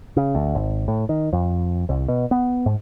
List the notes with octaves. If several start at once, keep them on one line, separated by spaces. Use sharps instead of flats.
C#3
D2
G#1
A2
D#3
F2
C2
B2
B3
G#2